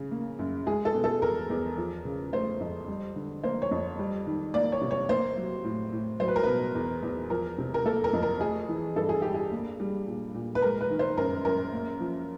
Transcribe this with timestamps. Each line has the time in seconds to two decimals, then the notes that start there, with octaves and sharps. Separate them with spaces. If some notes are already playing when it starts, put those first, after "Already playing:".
Already playing: C#3
0.11 A#3
0.39 F#2
0.67 G#3 G#4
0.85 A4
0.95 B2
1.04 A4
1.22 E2 A#4
1.50 E2
1.78 F3
2.05 C#3
2.32 A3 C5
2.60 F2
2.88 G3
3.16 D3
3.43 A#3 C5
3.62 C#5
3.71 F2
3.99 G3
4.27 D#3
4.54 A#3 D5
4.72 C#5
4.81 C3
4.91 C#5
5.09 A#3 C5
5.37 F#3
5.64 A2
5.92 A2
6.20 F#3 C5
6.28 B4
6.36 A#4
6.43 B2 B4
6.75 E2
7.03 E2
7.30 F3 A#4
7.58 C3
7.74 A#4
7.86 A#3 A4
8.04 A#4
8.13 F2
8.23 A#4
8.41 A3 G#4
8.69 E3
8.96 G2 A4
9.09 G#4
9.22 G2 G4
9.34 G#4
9.52 A#3
9.80 G3
10.07 A#2
10.35 A#2
10.55 B4
10.62 G#3 A#4
10.81 B4
10.90 D#3
10.99 C5
11.17 F#2 A#4
11.45 F#2 A#4
11.73 A#3
12.00 F3